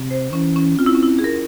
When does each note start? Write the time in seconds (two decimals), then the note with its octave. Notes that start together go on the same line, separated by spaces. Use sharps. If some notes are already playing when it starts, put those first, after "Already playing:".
Already playing: C3
0.10 C5
0.33 E3 C#4
0.56 C#4
0.79 C4 F4
0.86 E4
0.95 C#4
1.03 E4
1.19 G#4
1.24 A#4